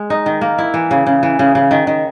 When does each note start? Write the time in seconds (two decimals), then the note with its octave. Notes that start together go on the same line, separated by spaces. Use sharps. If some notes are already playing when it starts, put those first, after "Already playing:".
Already playing: G#3
0.10 D#4
0.26 D#3
0.41 A#3
0.58 E4
0.74 E3
0.91 C#3
1.07 C#3
1.23 E3
1.39 C#3
1.55 C#3
1.71 D#3
1.87 D#3